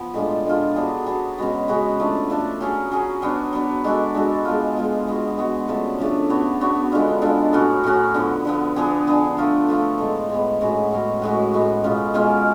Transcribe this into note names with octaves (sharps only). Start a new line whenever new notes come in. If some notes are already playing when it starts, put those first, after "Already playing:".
Already playing: F3 B3
A2 G#3 D4 F4
A2 G#3 D4 F4
F#3 B3 D4 G#4
F#3 B3 D4 G#4
C#3 G#3 B3 F#4
C#3 G#3 B3 F#4
F3 A3 D4
F3 A3 D4
F#3 C#4 G#4
F#3 C#4 G#4
F#3 B3 D4
F#3 B3 D4
G#3 D4 F#4 A4
G#3 D4 F#4 A4
G#3 B3 F4
G#3 B3 F4
G#3 B3 F#4
G#3 B3 F#4
C#3 F3 A3 D4
C#3 F3 A3 D4
B3 D4 F#4 C#5
B3 D4 F#4 C#5
D3 G#3 D4 F4
D3 G#3 D4 F4
A2 F#3 C#4 F#4
A2 F#3 C#4 F#4
D3 F3 B3
D3 F3 B3
F3 B3 D4 G#4
F3 B3 D4 G#4
F3 A3 F4 A4
F3 A3 F4 A4
A2 G#3 B3
A2 G#3 B3
A2 G#3 C#4 F#4
A2 G#3 C#4 F#4
A2 G#3 B3 F#4
A2 G#3 B3 F#4
B2 G#3 C#4 F4
B2 G#3 C#4 F4